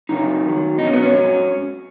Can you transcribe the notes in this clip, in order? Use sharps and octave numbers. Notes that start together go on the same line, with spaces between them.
F#2 C#3 F#3 D#4
F#2 D#3 F#3
B2 F#3 C#4 D#4
B3
C#4
G#2 F#3